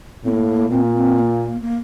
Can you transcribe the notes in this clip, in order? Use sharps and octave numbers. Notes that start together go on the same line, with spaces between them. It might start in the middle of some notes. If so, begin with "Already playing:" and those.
A2 A#3 C4
A#2 C4
A#3
C4
C4
A#3
A#3